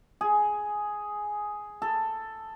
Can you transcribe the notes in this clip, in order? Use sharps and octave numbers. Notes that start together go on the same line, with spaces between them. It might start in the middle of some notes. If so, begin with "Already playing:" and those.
G#4
A4